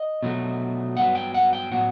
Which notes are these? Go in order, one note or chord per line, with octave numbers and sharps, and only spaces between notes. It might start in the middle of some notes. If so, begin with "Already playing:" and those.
Already playing: D#5
B2 F#3 A3
G2 F#3 B3 F#5
G5
F#5
G5
A2 F#3 B3 F#5